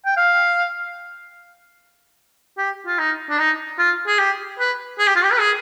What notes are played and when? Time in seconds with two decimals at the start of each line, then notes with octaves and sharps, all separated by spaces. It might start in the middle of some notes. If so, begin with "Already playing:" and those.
0.05 G5
0.17 F5
2.58 G4
2.86 F4
2.99 D#4
3.30 D4
3.39 D#4
3.78 F4
4.07 G#4
4.19 G4
4.59 B4
4.99 G#4
5.07 G4
5.16 F4
5.24 G4
5.32 B4
5.39 G#4